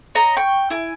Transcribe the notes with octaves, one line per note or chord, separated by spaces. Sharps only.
C#5 D#5 A#5
G5 C#6
E4 G#5